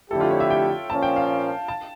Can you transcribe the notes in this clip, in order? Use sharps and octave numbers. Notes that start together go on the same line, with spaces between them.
F2 D3 A3 E4 G4 A4
F4
C#5
E5
G5
A#2 F3 A#3 C#4 A5
G5
F5
A5